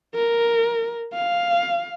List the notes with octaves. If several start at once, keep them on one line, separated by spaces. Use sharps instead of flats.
A#4
F5